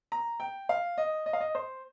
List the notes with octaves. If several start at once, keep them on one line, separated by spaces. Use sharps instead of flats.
A#5
G5
F5
D#5
D#5
F5
D#5
C5